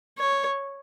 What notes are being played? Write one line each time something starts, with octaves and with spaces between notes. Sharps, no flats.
C#5